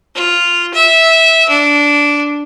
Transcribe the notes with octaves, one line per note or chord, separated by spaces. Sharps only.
F4
E5
D4